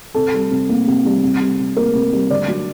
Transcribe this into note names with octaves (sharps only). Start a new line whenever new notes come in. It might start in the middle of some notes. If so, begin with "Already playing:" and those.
C3 A4
G3
C3
A#3
C3
G3
C3
G3
C3
A#3 A#4
C3
G3
D3 D5
F#3